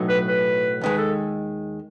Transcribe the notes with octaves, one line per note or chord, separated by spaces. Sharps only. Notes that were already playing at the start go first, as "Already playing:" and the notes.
Already playing: B1 A2 F#3 B3 D#4
B4
B4
D#2 D#3 G#3 B4
A4